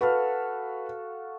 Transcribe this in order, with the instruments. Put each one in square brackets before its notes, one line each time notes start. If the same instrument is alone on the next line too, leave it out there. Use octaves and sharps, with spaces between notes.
[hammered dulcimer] F#4 A4 F5 [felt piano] B4